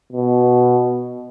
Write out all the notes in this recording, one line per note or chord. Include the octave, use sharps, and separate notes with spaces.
B2